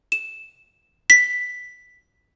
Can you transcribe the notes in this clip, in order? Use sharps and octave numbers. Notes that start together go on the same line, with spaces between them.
E7
B6